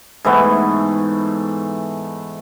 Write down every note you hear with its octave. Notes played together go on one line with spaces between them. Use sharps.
G#2 E3 A3 B3